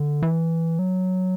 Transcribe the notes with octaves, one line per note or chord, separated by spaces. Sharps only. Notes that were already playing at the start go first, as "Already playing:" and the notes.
Already playing: D3
E3
F#3